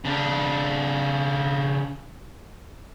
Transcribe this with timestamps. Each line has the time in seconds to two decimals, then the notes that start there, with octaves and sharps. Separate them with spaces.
0.05 C#3 D4